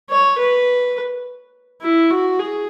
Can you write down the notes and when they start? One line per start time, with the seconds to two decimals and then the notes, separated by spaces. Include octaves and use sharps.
0.10 C#5
0.39 B4
1.82 E4
2.11 F#4
2.39 G#4